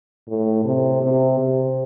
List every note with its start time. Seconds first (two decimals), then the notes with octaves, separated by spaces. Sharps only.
0.29 A2
0.65 C3
1.02 C3
1.39 C3